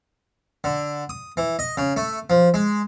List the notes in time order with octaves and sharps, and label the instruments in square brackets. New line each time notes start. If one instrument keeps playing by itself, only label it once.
[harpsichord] D3
D#6
E3
D#5
C#3
A3
F3
G#3